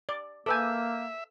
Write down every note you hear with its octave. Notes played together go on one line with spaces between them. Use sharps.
D5
A#3 A4 B4 E5 G#5 D6 E6 G6